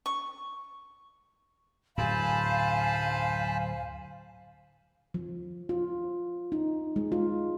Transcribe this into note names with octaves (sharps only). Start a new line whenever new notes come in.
C#6
D1 F#2 C5 F5 G#5 A5 B5
F3
F4
D#4
G#3
F4